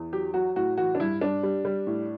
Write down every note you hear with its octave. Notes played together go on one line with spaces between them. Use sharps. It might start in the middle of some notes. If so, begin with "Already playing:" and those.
Already playing: E2
F#3 G4
F#3 F#4
A2 F#4
E3 F#4
D4
G2 E4
G2 D4
G3
G3
A2